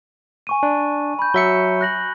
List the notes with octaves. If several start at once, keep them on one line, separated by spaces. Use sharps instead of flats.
G#5 C#6 D#7
D4
B5 G6
F#3 E5 C#7 G7
F#6 A#6 F#7